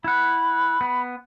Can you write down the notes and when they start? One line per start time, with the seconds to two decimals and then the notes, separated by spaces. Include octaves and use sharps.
0.04 E4 F#5 B5
0.81 B3